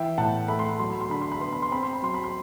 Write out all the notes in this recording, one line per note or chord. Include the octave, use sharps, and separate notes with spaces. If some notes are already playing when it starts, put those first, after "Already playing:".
Already playing: E3 E5 G5
A2 F#5 A5
A3 B5
C6
B5
F#3 C6
B5
C6
D3 B5
C6
B5
B3 C6
B5
C6
C4 B5
C6
B5
F#3 C6
B5
C6